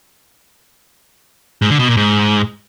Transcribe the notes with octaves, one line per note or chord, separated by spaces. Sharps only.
G#2
D3
B2
A#2
G#2